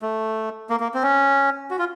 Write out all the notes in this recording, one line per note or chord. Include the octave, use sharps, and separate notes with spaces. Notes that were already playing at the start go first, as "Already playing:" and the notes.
A3
A#3
A#3
C4
C#4
F#4
F4